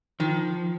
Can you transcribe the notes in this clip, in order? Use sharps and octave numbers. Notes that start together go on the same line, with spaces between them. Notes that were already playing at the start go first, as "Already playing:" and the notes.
D#3 F3